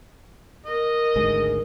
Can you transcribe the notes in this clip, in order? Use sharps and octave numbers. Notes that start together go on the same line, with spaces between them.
A#4 D#5
G#1 D2 G#3